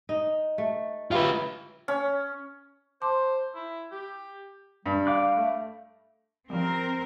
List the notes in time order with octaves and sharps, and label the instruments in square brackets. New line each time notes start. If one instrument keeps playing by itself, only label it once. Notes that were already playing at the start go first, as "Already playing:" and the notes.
[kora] D#4
A3
[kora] F#3 E4 G4 [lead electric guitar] F4 B4
[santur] C#4
[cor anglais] C5 [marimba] A5 C6 D6
[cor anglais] E4
G4
[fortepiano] G2 [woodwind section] G3
[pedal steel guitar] F5 D6 F#6
[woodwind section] A3
[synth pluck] F3 G3 [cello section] C4 A#4